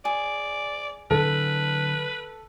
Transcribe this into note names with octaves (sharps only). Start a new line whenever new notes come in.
G#4 D5
D3 F#3 D4 A4 B4